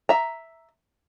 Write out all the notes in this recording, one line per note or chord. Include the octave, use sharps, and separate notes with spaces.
E5 A#5